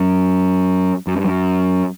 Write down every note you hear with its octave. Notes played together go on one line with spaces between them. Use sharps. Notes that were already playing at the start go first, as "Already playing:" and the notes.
Already playing: F#2
F#2
G2
F#2